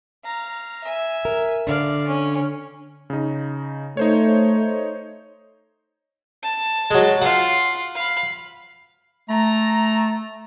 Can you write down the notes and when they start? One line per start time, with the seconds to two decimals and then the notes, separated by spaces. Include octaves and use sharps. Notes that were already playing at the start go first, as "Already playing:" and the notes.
0.24 F5 A#5
0.84 E5 G#5
1.25 A#4
1.67 D3 D4 D5 F5
2.07 C#4
3.10 C#3 D#4
3.97 A3 D#4 C5 C#5
6.42 A5
6.91 F#3 G#3
7.21 F4 F5 F#5
7.95 F5 B5
9.30 A3 A#5